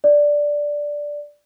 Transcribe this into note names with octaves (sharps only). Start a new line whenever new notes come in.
D5